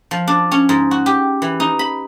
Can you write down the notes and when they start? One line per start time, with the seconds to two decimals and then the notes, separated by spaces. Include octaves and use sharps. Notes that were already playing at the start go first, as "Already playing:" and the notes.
0.11 F3
0.28 D4
0.52 C#4
0.69 G#2
0.91 F#4
1.06 G4
1.42 E3
1.60 D#4
1.79 B5